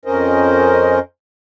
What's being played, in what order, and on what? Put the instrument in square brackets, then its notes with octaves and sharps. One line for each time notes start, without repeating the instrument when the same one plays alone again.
[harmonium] F2 C#4 A#4 C5 D#5